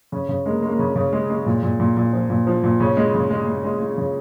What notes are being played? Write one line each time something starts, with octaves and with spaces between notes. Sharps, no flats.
C#3 C#4
C#3
G#3 A#3
G#3
A#3
C#3 C#4
C#3
G#3
G#3
A#2
A#2
A#2
A#2
F3
A#2
F3
A#2
C#3 C#4
G#3
C#3
G#3
G#3
G#3
G#3
C#3